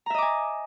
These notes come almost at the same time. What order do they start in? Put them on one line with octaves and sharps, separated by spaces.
A#5 E5 D#5 D6 G#5